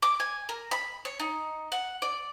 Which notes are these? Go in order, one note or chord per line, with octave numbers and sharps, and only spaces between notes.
D6
G#5
A#4
B5
C#5
D#4
F#5
D5